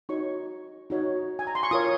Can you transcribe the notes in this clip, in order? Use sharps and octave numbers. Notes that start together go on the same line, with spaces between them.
D#4 F#4 C#5 C#6
D#4 F#4 C#5
G#5
A#5
C6
C#6
F4 A#4 C#5 D#6